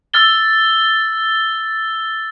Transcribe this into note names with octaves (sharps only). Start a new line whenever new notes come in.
E6 F6 A6 G7